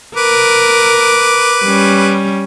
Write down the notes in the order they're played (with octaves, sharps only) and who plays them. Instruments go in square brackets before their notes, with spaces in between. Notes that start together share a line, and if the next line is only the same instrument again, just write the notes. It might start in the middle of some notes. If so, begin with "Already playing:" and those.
[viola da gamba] A#4 [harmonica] B4 D6
[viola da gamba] G3 C#4